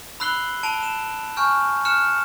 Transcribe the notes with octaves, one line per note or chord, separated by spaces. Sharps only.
B5 E6 F#6 C7 F#7 G7
A5 D7 F7 G7
E7
G#5 C#6 F6 G6
F6 F#6 C#7 E7